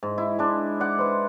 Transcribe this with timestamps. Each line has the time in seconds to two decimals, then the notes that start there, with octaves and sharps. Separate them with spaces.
0.03 G#2
0.18 E4
0.39 G#3 D4
0.80 D5 F#5
0.99 B4 C5